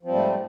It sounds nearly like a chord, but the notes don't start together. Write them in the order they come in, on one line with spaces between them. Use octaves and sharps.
F3 C4 G3 G#2 A3